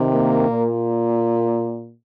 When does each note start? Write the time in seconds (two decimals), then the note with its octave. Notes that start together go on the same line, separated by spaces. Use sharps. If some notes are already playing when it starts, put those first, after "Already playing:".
Already playing: C3 D#3
0.13 A#3
0.49 A#2